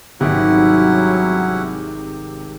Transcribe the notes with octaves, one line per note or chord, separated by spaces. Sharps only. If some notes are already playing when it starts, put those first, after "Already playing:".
G#1 C3 D#3 F#3 G3 C#4 E4 F#5